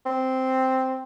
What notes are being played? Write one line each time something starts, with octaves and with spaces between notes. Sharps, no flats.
C4